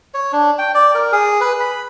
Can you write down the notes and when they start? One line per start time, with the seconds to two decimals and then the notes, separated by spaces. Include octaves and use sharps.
0.14 C#5
0.33 D4
0.58 G5
0.75 D5
0.95 A#4
1.12 G#4
1.41 B4
1.60 B5